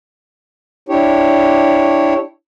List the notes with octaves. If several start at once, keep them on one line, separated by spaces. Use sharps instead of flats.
D4 E4 G4 C#5